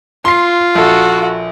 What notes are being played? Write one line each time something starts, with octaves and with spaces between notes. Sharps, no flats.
F4 C6 C7
A#1 F#4 A4